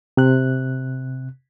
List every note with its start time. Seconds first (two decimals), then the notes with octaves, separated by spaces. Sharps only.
0.17 C3 F#6